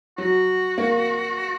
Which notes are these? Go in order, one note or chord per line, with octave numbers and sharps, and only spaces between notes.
F#3 F#4
A#3